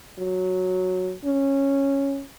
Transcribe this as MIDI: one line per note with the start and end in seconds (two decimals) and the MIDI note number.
0.19 1.13 54
1.25 2.24 61